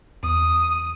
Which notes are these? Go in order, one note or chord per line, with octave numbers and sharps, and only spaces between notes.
E2 D#6